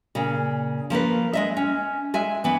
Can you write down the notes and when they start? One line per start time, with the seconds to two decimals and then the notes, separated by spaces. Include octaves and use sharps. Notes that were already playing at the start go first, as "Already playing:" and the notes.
0.15 A#2 C#3
0.90 F3 A#3 C#4 B4
1.33 G#3 D#5 E5
1.57 C#4
2.14 G#3 E5 G#5
2.44 E3 B3